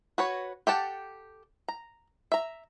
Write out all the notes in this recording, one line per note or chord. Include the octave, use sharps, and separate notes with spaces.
F#4 B4 C#5
G4 A4 F#5 G5 A5
A#5
E5 A#5